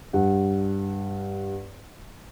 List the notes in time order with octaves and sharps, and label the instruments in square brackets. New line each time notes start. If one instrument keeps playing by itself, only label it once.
[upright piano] G2 F#5